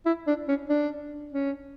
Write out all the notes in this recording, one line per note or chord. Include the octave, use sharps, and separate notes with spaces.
E4
D4
C#4
D4
C#4